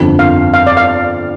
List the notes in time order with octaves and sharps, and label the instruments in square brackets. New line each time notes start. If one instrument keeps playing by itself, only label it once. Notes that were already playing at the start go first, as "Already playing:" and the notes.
Already playing: [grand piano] G1 F2 D3
[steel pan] F5
F5
D5
F5